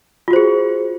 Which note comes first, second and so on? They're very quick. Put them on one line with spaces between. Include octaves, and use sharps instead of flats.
F4 F#4 C5 G#4